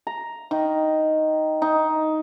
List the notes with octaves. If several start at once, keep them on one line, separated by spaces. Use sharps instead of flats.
A#5
D#3
D#4